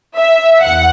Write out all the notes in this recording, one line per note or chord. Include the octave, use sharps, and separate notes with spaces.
E5
E2 F#5